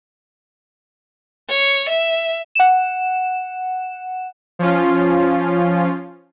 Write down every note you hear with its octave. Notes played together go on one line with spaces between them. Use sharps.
C#5
E5
F#5 E7
F3 C#4 F4